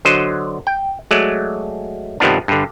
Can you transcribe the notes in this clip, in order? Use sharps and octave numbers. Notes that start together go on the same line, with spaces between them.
D3 F#3 C5 D#5
G5
F#3 G#3 A3 D5
G2 C3 D#3 F3 B3 D4
G2 D3